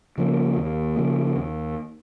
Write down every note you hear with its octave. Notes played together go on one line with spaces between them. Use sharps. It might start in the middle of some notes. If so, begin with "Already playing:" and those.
C#3 F3 A#3
D#2
C#3 F3 A#3
D#2